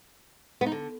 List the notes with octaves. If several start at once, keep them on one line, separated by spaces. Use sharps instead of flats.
B3
D#4
D3